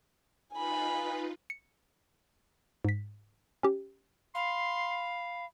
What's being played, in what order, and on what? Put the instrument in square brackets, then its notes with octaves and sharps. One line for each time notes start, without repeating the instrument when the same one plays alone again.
[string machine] D#4 F4 B4 [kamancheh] G#5 B5
[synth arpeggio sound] C#7
G#2 B6
C#4 G4
[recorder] F5 [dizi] B5 [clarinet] C6